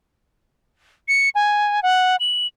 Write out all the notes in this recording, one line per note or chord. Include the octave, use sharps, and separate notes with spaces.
C#7
G#5
F#5
F#7